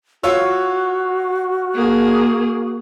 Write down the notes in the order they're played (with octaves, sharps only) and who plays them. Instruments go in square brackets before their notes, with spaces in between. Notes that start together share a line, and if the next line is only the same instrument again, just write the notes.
[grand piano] F4 C#5 E6 [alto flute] F#4
[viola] A#3 G#4